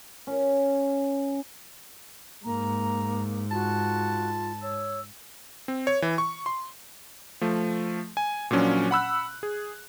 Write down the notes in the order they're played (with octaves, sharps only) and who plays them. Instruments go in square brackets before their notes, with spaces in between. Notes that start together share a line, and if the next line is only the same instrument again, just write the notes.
[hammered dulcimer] C#4
[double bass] G#2 [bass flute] A#3 [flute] A#5
[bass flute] F4 [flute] F#4 [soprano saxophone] A5
[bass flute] C#5 [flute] E6
[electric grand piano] C4
C#5
E3
C#6
C6
F3 A3
G#5
A#2 F3 F#3 C#4 D4
F#5 B5 E6 F#6
G#4